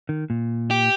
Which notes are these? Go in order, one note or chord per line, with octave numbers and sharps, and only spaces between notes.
D#3
A#2
G4